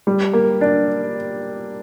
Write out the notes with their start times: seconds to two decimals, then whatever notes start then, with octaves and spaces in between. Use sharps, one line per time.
0.07 G3
0.33 A#3
0.61 D4